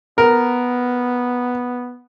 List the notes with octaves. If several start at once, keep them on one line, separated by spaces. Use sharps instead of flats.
B3 A#4